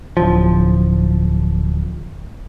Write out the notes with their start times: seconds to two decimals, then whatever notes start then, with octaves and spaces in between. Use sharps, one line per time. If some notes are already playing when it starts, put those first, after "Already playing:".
0.17 D1 F3